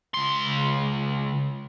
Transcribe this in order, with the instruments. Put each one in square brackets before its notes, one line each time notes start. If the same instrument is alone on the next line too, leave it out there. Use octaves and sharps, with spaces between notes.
[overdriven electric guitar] C#2 C6